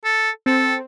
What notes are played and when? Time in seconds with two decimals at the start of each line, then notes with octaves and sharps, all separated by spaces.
0.04 A4
0.46 C4 A4